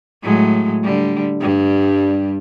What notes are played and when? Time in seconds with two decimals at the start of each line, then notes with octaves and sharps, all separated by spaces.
0.23 A2 F#3 G#3
0.84 D3 G3
1.41 G2 G3